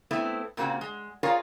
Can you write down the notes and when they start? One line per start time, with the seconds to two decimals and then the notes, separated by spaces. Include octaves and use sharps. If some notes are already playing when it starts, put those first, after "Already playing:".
0.11 A3 B3 C4 E4
0.57 A#2 C#3 A#3 C4 F#4
0.81 G#3
1.23 F4 G#4 A#4 C#5 D5 F5